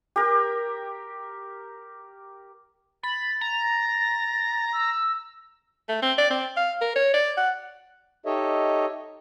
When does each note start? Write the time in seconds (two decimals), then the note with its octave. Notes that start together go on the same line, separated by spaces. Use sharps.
0.16 G4 A#4
3.03 B5 A6
3.41 A#5
4.73 E6
5.89 A3
6.02 C4
6.18 D5
6.30 C4
6.57 F5
6.81 A#4
6.96 C#5
7.14 D5
7.37 F#5
8.26 D#4 G4 A4 C#5 D#5 E5